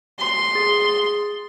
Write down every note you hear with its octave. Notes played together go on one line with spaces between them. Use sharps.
C6
G#4 D#6 A6